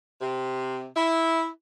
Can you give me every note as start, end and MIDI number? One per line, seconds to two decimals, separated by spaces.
0.21 0.86 48
0.96 1.49 64